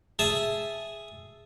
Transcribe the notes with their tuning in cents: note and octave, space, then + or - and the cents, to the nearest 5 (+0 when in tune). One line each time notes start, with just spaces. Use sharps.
G#4 +0 E5 +0 A5 -10